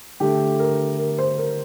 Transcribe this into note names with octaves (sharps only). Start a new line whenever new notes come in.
D3 A3 G4
A#4
A#4
C5
A#4